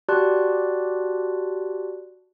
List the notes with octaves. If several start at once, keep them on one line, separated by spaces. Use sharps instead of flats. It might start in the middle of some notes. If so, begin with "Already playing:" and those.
F#4 G4 D5 A5 C6 F#6